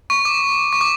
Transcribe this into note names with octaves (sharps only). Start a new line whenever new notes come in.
C#6
D6
C#6
D6